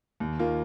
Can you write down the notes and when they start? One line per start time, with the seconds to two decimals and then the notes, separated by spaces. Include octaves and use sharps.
0.20 D#2
0.39 D#3 A#3 F4